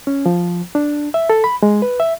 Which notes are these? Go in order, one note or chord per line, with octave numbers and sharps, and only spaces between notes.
C#4
F3
D4
E5
A4
B5
G#3
B4
E5